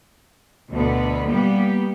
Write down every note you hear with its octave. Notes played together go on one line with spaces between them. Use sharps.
D2 B2 D3 B3
G3 A#3 B3 G4